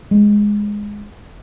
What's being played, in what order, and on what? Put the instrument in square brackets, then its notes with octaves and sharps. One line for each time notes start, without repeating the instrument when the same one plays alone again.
[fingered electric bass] G#3